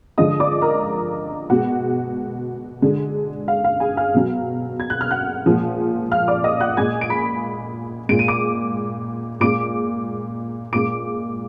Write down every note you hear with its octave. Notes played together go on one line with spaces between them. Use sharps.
D3 F3 G#3 D#5 D#6
D5 D6
A#4 A#5
B2 G#3 F#4 F#5
D3 G#3
F5
F5
G#4 G#5
F5 F6
B2 F#3
G#6
F#6
F6
F#5 F#6
A#2 F3 G#3
F5 F6
D5 D6
D#5 D#6
F#5 F#6
A#2 G#3 G#5 G#6
D7
B5 B6
A#2 G#3 D7
D#7
D6 D7
A#2 G#3 D6 D7
A#2 G#3 D6 D7